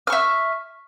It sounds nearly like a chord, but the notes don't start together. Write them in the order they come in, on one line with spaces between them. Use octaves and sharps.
F6 C#6 E5